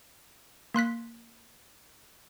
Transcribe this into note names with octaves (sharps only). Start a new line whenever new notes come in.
A#3 C6 F#6 B6